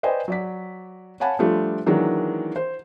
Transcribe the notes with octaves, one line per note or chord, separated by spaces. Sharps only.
B4 C5 D5 D#5 G5 G#5
F#3 D5 B6
C#5 F5 F#5 G#5 A5 B5
F3 G3 A3 D4 F4
D#3 E3 F#3 G#3 A#3 D4
C5